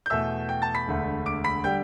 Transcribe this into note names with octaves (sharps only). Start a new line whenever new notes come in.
G6
E2 B2 A3 E5 E6
G5 G6
A5 A6
B5 B6
E1 D2 D3 A3
D6 D7
B5 B6
D3 G3 G5 G6